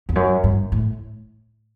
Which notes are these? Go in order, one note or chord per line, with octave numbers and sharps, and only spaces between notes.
E2
F#2
G2
A2